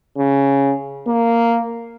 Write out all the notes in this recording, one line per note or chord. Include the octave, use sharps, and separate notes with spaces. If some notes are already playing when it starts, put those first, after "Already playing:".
C#3
A#3